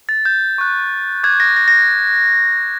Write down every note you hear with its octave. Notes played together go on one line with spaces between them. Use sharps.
A6
G6
C#6 F#6
D6 F#6 G#6
A#6
A#6
A#6